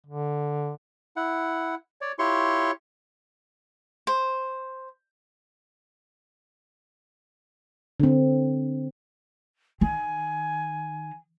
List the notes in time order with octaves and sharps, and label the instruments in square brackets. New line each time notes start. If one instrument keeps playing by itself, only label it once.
[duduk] D3
[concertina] E4 F#5
C#5 D5
E4 F4 G4 C#5 C6 C#6
[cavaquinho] C5
[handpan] D3 C4
[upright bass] D#3 [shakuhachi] G#5